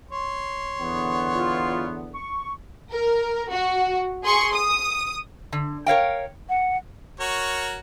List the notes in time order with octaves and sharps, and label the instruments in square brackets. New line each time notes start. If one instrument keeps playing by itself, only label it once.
[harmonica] C#5 C6
[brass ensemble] E2 D3 B3
[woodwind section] F4
C#6
[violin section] A#4
F#4
G#4 C6 C#6
D#6
[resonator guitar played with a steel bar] D3
A#4 C#5 F5 G5
[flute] F#5
[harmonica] F#4 A#4 C#5